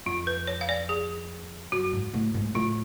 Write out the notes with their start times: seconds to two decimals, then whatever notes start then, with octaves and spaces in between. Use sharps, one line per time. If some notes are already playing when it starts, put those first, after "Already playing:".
0.06 F2 F4
0.27 B4
0.47 C#5
0.61 F5
0.69 D5
0.89 G#4
1.72 F#2 F#4
1.93 G#2
2.14 A2
2.34 G#2
2.55 A2 F4